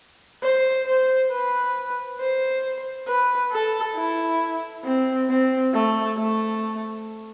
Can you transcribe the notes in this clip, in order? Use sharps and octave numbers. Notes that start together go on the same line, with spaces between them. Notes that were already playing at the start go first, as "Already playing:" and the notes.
C5
C5
B4
C5
B4
A4
E4
C4
C4
A3
A3